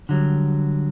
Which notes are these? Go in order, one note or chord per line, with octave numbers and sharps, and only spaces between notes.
D3 F#3 G3